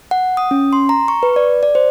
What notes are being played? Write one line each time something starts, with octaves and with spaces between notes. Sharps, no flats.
F#5
D#6
C#4
C6
A#5
C#6
B4
D5
D5
C5